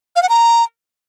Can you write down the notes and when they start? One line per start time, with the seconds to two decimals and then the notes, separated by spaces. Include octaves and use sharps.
0.16 F5
0.22 F#5
0.29 A#5